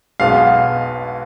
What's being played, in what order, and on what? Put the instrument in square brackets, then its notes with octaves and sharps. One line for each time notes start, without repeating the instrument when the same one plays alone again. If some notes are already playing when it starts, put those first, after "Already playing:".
[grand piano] B1 B2 G#3 B3 F5